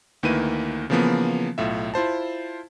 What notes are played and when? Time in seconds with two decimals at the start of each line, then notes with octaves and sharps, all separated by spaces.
0.23 D2 D#3 A#3 E4 B4 D#7
0.90 C#3 E3 F3 A#3 B3
1.58 B1 A2 F4 E5
1.94 E4 F4 C5 A5